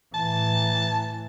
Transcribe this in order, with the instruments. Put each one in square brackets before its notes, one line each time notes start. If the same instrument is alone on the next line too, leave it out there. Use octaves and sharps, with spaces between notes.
[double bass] A2 E3 [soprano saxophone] A5